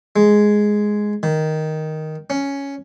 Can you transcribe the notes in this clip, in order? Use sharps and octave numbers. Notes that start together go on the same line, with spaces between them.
G#3
D#3
C#4